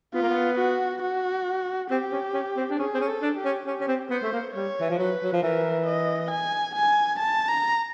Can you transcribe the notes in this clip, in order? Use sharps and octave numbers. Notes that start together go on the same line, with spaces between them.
B3 F4
A#3
B3
F#4
F#4
C4 G4
C#4
C#4
C4
D4
C#4 G#4
C4
C#4
A4
D4
G4
C#4
C#4 G4
C#4
C4
B3 C5
A3
A#3
G3 C#5
E3
F3
F#3 B4
F#3
F3
E3 A#4
D#5
G#5
G#5
A5
A#5